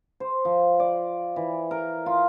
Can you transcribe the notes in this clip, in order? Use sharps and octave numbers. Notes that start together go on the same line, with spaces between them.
C5
F3
D5
E3
A#4
F4